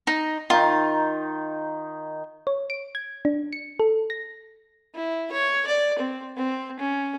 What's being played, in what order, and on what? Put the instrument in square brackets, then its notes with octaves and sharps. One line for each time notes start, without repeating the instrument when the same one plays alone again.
[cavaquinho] D#4
[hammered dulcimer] D#3 D#4 [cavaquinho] F4
[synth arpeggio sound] C#5
D7
G#6
D4
C#7
A4
A#6
[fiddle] E4
C#5
D5
C4
C4
C#4